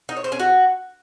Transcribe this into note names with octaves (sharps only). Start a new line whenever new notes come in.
D#4
C#5
C5
C#4
F#4